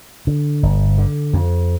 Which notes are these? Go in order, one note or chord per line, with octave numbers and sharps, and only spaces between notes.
D3
G1
D3
F2